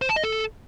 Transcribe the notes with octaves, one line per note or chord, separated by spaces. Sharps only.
C5
A5
D#5
A4